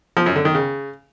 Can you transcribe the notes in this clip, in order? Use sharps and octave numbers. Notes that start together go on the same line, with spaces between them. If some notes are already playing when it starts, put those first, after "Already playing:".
F3
F#2
D3
D#3
C#3